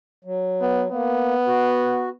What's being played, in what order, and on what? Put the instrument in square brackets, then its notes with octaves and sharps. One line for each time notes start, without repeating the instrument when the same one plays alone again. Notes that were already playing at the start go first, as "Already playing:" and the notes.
[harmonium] F#3
[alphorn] B3
[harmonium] A#3 [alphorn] B3
[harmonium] F#4